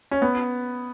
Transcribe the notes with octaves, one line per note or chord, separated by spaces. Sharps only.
C#4
B3